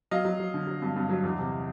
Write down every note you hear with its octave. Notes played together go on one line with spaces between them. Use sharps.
F#3 D#5 F5
F#3
F#3
D3
F#3
G2
G2
F#3
E2
C3